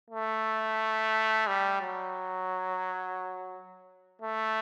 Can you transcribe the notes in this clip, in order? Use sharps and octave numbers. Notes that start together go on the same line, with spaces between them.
A3
G3
F#3
A3